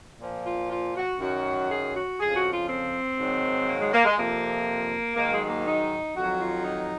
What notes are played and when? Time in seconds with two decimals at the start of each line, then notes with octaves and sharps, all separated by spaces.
0.21 A#2 F3
0.46 F4
0.71 F4
0.96 F#4
1.20 F#2 D#3 F#3 F#4
1.70 G#4
1.94 F#4
2.19 F2 C#3 F3 G#4
2.35 F#4
2.53 F4
2.69 C4
3.18 G#2 D#3 F#3
3.68 A#3
3.80 G#3
3.93 A#3
4.05 G#3
4.17 F2 C3 F3 A#3
5.17 G#2 D#3 F#3 A#3
5.32 G#3
5.44 G#3
5.49 A#3
5.66 D#4
6.15 F2 D#3 F#3 F#4
6.41 F4
6.65 D#4